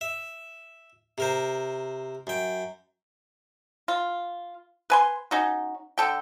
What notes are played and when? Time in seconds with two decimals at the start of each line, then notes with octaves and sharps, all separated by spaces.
0.01 E5
1.18 C3 A#4 C5
2.27 F#2 G5
3.88 F4
4.90 B4 G#5 C6
5.31 C#4 D#4 F#4
5.98 D3 A4 G5